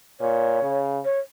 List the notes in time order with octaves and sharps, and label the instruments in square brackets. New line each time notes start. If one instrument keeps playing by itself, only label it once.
[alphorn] A#2 [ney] C#5
[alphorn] C#3
[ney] C#5